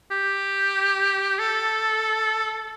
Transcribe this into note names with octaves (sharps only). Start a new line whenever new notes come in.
G4
A4